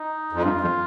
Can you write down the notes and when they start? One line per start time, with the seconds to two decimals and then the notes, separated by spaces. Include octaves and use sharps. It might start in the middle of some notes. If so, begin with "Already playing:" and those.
Already playing: D#4
0.32 F2
0.42 G2 F4
0.61 F2